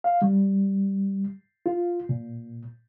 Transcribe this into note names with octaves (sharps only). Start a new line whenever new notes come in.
F5
G3
F4
A#2